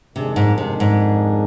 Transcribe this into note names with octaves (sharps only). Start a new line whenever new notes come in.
F2 C3 D#3 G#3 D4 G#4
G#2
C3
G#2